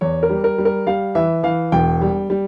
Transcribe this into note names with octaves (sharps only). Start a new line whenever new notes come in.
E2 C#5
A#4
G3
A#4
G3
A#4
G3 F5
E3 E5
E3 F5
E1 G5
G3
G3